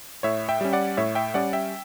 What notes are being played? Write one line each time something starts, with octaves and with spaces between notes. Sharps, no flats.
A2 C#5 E5
E5 G5
G3 C#4
D5 F#5
A2 C#5 E5
E5 G5
G3 C#4 D5 F#5
E5 G5